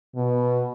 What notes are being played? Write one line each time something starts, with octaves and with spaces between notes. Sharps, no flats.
B2